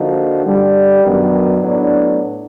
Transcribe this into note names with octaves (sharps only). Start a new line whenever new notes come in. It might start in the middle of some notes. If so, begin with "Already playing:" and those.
Already playing: D3 F3 A#3 D#4 F#4
G2 D3 G3
F#2 D#3 F#3 B3 D4
A2 F#3 B3 D4